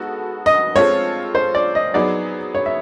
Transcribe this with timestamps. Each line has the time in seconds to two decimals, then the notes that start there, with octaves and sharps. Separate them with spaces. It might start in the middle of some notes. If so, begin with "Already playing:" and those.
Already playing: G#3 B3 D#4 F#4 A4
0.46 D#5
0.76 G#3 C4 F4 A4 C#5
1.35 C5
1.55 D5
1.75 D#5
1.94 F#3 B3 D#4 G#4 D5
2.55 C#5
2.66 E5